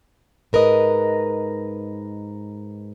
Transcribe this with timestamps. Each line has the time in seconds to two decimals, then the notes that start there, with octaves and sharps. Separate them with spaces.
0.53 G#2 A#4 B4 D#5